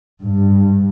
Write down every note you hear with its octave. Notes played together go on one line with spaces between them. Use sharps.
G2